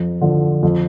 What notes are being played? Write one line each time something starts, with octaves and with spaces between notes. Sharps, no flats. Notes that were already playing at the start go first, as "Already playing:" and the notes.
Already playing: F2
D3 F3
F2